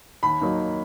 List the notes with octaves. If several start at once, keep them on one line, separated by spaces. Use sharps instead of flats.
D#2 B5
D#3 F#3 A#3 D#4